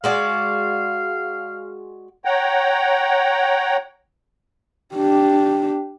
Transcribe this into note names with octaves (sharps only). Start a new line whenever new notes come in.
G#3 F#4 D5 F5
C#5 F#5 G5 A#5
D4 G4